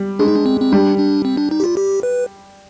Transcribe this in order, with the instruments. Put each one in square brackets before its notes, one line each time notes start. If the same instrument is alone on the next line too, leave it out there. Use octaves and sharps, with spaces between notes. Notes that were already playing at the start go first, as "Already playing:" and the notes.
Already playing: [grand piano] G3
[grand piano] G#3 [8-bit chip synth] D4
[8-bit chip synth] D#4
D4
C4
C4
[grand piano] G3 [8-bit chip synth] D4
[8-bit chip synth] D4
C4
D4
D#4
G4
F4
G4
B4